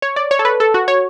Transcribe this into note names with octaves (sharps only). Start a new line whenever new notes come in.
C#5
D5
C#5
A4
B4
A4
F#4
C#5